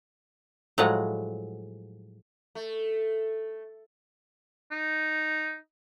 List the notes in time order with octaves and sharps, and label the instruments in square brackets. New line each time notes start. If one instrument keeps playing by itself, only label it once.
[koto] A2 F3 F#3 G#3 F#5
[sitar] A3
[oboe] D#4